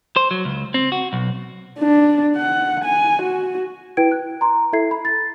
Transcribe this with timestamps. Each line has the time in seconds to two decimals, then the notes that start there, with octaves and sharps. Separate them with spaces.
0.16 C5
0.31 F#3
0.45 C#2
0.74 C4
0.92 F#4
1.13 B1
1.79 D4
2.37 F#5
2.84 G#5
3.22 F#4
3.97 E4 B4 G5 G#6 D7
4.12 F#6
4.41 A#5 C6
4.73 E4 A4 E5 G#6 C7
4.91 B5
5.05 A6